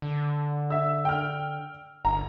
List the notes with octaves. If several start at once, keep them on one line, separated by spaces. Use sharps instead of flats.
D3
E5 E6
G5 F6
G1 A#5